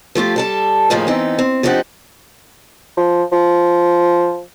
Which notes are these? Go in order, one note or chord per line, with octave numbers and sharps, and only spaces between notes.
F3 A3 F4 G4
G3 A4 A5
D#2 A2 D#3 F3 A#3 G#4
E3 B3 C4 D#4
C4
F3 C4 D4 D#4 G4 F#5
F3
F3